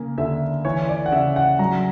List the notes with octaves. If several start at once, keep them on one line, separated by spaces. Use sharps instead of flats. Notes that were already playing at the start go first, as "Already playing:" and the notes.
Already playing: C#3 A#3
D3 E5
E3 C#5
D5
F#5
C#3 E5
F#5
F#3 A#5